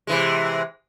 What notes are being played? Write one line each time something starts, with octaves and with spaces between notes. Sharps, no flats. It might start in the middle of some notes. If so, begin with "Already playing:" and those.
C3 E3 G#3